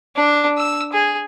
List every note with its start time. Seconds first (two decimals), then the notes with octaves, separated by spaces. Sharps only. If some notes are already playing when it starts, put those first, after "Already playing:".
0.16 D4
0.58 E6
0.93 G#4